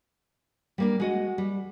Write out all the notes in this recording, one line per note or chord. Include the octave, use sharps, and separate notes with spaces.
G3 A#3 D4
G#3 F#4 D#5
G3